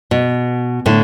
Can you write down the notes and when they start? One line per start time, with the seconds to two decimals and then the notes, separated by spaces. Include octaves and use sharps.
0.11 B2
0.86 A2 D3